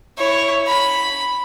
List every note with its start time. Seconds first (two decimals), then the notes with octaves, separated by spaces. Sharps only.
0.17 E4 C#5
0.67 B5